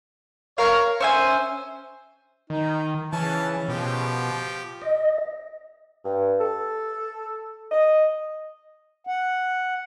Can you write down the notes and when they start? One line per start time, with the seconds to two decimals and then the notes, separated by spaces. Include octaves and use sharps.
0.58 A#4 C#5 F5
1.00 C#4 C5 E5 G#5
2.50 D#3 D#4
3.13 C#3 E3 C#4 A5
3.69 B2 F3 G4
4.82 D#5
6.04 G2
6.39 A4
7.72 D#5
9.07 F#5